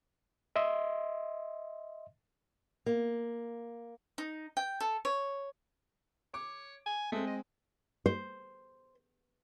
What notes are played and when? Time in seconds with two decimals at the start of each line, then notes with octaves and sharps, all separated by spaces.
0.56 D#5 E5 C6
2.86 A#3
4.18 D#4
4.57 G5
4.80 A4
5.05 C#5
6.34 C#5 D6
6.86 G#5
7.12 G#3 A3 C4
7.27 D#5
8.06 C5